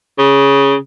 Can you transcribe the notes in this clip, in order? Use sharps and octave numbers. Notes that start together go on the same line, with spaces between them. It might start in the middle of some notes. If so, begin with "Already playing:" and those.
C#3